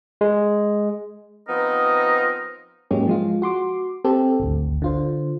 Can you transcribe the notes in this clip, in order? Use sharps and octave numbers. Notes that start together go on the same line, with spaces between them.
G#3
F3 B3 C4 D#4 A#4 D#5
G#2 F#3 G#3 A#3 C#4 G4
F3 G#3 F4
F#4 C6 D6
C4 G4 A4
G#1 D2
D3 F4 C5